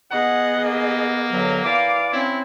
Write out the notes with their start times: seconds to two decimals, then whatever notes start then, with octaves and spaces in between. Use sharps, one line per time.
0.11 B3 G#4 D#5 F#5
0.64 A#3
1.31 G2 D3 F#3
1.63 E3 D5 F5 D6
2.13 C4 C#4 E4